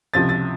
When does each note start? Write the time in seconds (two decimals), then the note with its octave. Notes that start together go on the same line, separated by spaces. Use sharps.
0.14 C#2 C3 F3 A6
0.29 A6